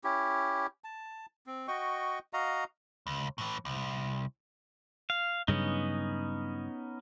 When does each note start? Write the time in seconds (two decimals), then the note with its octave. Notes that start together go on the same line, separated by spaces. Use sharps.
0.04 C#4 E4 G4
0.84 A5
1.47 C4
1.68 F#4 D#5 G5 C#6
2.33 F#4 D#5 F5 A#5
3.07 C#2
3.38 A2 E3
3.65 C2
5.10 F5
5.48 G2 C#3 F#3 B3 C#4 D#4